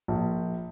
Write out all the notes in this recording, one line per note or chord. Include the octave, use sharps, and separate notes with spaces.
A#1